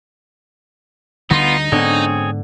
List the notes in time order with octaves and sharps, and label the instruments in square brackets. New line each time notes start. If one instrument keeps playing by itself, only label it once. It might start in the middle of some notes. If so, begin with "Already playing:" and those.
[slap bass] D2 D3 G3 [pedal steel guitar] B3 F4 [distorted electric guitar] D#4
[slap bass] G#2 B3 D4 [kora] D3 [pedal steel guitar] C4 G#4 C#5